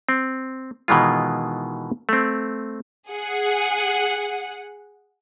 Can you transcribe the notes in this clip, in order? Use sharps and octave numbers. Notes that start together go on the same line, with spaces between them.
C4
B2 D#3 E3 G#3 F4
A3 C4
G#4 F#5